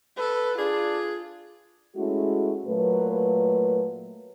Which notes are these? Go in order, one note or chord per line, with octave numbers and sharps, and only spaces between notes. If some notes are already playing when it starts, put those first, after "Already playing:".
A4 B4
D4 F4 G#4
G#3 A3 C#4 E4 F#4
A#2 F#3 A3 A#3 B4